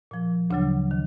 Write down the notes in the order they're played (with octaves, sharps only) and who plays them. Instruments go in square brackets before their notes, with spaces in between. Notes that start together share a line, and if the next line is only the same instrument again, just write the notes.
[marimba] A#2 F3
D2 C#3 F#3 D4
D#3